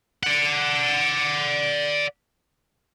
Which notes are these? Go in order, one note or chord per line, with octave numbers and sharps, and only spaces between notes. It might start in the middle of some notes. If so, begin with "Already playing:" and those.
D5 F#5